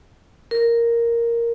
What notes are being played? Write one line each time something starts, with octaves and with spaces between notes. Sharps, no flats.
A#4